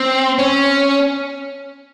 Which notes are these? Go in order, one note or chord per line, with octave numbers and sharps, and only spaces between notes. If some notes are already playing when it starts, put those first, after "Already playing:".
Already playing: C4
C#4